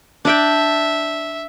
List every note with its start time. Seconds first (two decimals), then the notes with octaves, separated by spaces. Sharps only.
0.25 D4 D5 E5 G5